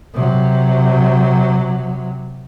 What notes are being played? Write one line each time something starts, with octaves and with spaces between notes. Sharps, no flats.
C3 F#3